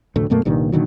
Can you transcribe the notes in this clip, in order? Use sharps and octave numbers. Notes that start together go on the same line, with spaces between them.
F1 D2 A2 A3
F#2 B2 A3 A#3
C2 G2 A#2 D#3
A#2 D3 D#3 F#3